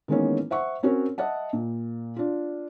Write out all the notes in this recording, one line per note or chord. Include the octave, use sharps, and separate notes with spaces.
D#3 E3 G#3 A#3 B3 C#4
C5 E5 F#5 C#6
C4 C#4 F#4 A#4 C#5
D#5 E5 F#5 A5
A#2
D4 F4